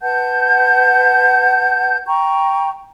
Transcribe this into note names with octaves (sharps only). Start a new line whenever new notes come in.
B4 F#5 A5 G6
G5 A#5 C#6